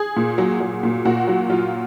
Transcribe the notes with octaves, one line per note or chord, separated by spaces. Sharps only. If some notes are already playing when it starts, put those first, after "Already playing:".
Already playing: G#4
A#2
F#3
F#3
A#2
A#2 F#4
F#3
F#3 F4